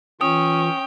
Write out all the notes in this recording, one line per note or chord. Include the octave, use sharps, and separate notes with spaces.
E3 C#4 F4 G5 D#6